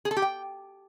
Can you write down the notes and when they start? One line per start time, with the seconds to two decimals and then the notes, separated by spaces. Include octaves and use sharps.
0.05 G#4
0.11 A4
0.17 G4
0.22 G5